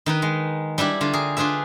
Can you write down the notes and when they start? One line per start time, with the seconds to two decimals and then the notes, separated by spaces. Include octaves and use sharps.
0.06 D#3 D#4 B4
0.22 G#3
0.78 G3 D4 E4 G4
1.01 D3 F4
1.13 G#4 A#4
1.37 D4 F4 G#4 B4 E5